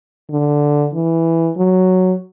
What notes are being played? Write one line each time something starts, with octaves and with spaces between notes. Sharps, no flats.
D3
E3
F#3